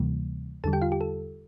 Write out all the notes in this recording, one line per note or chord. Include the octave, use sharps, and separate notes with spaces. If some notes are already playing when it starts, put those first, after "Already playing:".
Already playing: D2 C3 E3 G3 A#3
E2 D3 G3 A4 A5
G4 G5
F4 F5
G4
A4